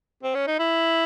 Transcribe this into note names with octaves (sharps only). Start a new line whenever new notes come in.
C4
C#4
D#4
E4